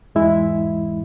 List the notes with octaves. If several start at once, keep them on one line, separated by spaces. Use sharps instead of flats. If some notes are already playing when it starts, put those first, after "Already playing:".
E2 G#2 E3 G#3 E4 E5